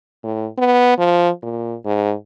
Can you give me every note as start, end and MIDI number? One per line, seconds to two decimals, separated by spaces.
0.24 0.48 45
0.58 0.98 59
0.98 1.30 53
1.43 1.75 46
1.85 2.14 44